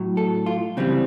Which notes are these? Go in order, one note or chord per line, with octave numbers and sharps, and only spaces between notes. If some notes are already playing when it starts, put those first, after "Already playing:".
Already playing: A2 F#3
A4
F4
C#3 E3 G3 C4